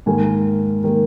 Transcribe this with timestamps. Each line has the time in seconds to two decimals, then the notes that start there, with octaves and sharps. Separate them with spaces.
0.06 G#2 D#3 A#3 G#5
0.84 D#3 A#3